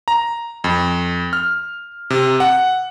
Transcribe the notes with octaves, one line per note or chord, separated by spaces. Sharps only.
A#5
F2
F6
C3
F#5